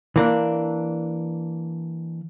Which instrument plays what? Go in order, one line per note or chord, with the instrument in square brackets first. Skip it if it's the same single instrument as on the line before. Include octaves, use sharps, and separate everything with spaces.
[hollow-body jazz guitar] E3 A#3 D4